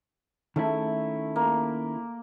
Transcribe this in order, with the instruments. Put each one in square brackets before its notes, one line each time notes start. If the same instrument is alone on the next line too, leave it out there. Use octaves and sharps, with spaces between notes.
[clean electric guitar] D#3 C#4 E4 [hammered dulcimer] A3
[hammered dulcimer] A#3